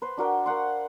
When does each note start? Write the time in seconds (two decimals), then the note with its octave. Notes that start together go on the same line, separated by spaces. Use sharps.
0.02 B4 C5
0.17 D4 F#4 A#4 G5
0.46 A#4 F5 F#5 C6